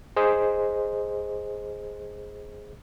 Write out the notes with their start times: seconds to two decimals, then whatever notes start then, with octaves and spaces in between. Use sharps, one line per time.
0.16 G#4 C5 D#5